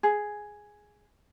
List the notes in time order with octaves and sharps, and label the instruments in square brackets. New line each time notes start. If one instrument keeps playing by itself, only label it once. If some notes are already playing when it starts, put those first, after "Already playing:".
[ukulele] G#4